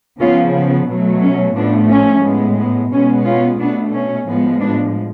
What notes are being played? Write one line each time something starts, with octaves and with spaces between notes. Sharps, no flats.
C#3 F3 B3 C#4 F4
B3
B2 F#3 A3
C#4
A2 F3 A3 B3 D4
C#4
A2 G#3 B3
B3
B2 G#3 B3 C#4
C#4 F4
B2 A3 B3 D4
C#4
A2 F3 G#3 B3
B3 D4